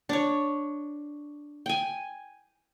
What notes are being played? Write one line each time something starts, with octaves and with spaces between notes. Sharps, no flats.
D4 C#5
G5 G#5